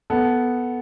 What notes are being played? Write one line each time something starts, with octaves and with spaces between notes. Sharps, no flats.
B3 A4